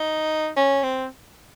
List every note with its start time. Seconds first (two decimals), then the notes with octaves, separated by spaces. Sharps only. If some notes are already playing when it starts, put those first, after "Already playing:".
Already playing: D#4
0.57 C#4
0.83 C4